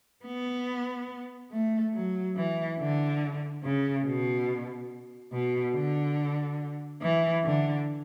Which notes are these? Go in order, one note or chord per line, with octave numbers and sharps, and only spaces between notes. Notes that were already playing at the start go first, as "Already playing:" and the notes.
B3
A3
F#3
E3
D3
C#3
B2
B2
D3
E3
D3